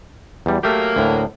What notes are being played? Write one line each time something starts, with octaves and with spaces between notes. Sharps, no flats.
E2 G3
F#3 A3 A#3 G4
D2 A2